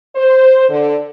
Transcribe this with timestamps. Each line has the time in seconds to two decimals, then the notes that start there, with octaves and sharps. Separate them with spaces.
0.16 C5
0.69 D3